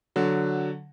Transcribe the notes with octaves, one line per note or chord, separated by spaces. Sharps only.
D3 F#3